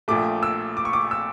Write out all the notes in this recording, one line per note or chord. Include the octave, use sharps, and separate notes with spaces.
A#1 A#2 A3 D6
E6
D6
C#6
D6
E6